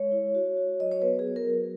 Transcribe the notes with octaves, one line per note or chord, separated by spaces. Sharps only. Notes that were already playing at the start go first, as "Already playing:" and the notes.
Already playing: G#3 C#5
E4
F#4
F#4
F#3 D#5
C#5
B3 B4
G#4
F#4
A#4
F#3